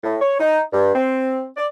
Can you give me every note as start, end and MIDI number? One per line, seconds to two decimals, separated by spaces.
0.03 0.15 45
0.21 0.35 73
0.40 0.59 63
0.72 0.91 43
0.94 1.45 60
1.57 1.65 74